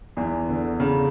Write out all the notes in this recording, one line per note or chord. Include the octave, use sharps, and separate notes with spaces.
E2 E3
D3
C#3